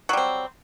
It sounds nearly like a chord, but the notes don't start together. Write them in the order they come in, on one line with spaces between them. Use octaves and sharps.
F#3 G3 C4